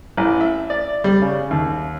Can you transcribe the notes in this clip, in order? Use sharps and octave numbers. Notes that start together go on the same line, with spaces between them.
A1
E5
D5
G3
C#3
D#2